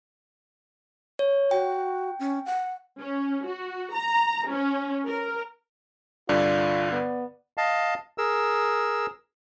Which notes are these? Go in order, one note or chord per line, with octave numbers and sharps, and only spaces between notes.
C#5
F#4 G5
C#4
F#5
C#4
F#4
A#5
C#4
A#4
C2 G2 D3 F4 D5
B3
D#5 F5 A5
G#4 A#4 E6